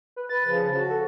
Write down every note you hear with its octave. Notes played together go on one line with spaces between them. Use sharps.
B4
B4 A6
C#3 F3
F#4 A5
A4